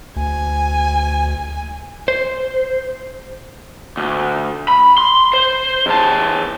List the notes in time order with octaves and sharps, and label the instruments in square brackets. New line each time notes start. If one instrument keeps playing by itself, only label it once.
[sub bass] D2 [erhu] G#5
[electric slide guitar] C5
[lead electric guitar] D2
B5
C6
C5
E2 A5